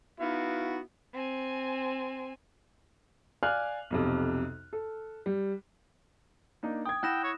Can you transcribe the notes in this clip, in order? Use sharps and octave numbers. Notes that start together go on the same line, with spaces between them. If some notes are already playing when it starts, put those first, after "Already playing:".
B3 D#4 E4 F#4 F5
C4 G#5
D5 F5 G#5 F6 F#6
B1 F2 C3
A4
G3
A#3 D4 D#4
G5 D#6 G#6
E4 F#5 G5 F#6 A#6 E7
C#5